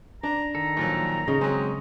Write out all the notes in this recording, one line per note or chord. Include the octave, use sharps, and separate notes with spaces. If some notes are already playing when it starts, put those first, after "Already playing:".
D4 A#5
D#3 A4 A#5
A#1 F3 F#3
C#3 D#4
F#3 G#3 C4 C#4